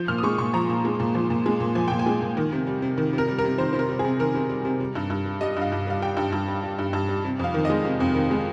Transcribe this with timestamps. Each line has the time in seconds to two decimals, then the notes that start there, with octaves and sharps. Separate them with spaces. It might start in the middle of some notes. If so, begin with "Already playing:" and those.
Already playing: F3 G6
0.08 A#2 F6
0.18 D#6
0.23 G#3 C#6
0.38 A#2 C#6
0.53 F3 A#5
0.69 A#2
0.85 G#3
1.00 A#2
1.15 F3
1.30 A#2
1.46 G#3
1.60 A#2
1.75 F3 G#5
1.88 A#2 G5
1.99 G#5
2.06 G#3
2.22 A#2
2.37 D#3
2.52 C3
2.67 G3
2.82 C3
2.98 D#3
3.13 C3
3.18 A#4
3.28 G3
3.39 A#4
3.44 C3
3.58 D#3 C5
3.73 C3 C5
3.79 A#4
3.89 G3
3.99 G#4
4.04 C3
4.19 D#3 A#4
4.35 C3
4.50 G3
4.65 C3
4.80 G3
4.95 G2
5.10 G2
5.26 G3
5.41 G3 D#5
5.57 G2 F5
5.72 G2
5.87 G3 F5
6.02 G3 G5
6.17 G2
6.33 G2
6.48 G3
6.63 G3
6.79 G2
6.93 G2
7.09 G3
7.24 C3
7.39 F2 F5
7.54 D#3
7.65 G#3 D#5
7.85 C3
8.00 F2
8.15 D#3
8.31 G#3